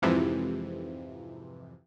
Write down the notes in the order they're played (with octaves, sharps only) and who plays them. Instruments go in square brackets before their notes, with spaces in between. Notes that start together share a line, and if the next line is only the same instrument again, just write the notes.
[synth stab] F2 G#2 C3 E3 F3